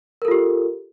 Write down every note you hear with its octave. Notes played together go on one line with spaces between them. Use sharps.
F4 G4 A4 A#4